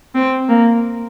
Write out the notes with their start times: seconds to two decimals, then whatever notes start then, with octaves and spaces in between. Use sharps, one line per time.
0.15 C4
0.49 A#3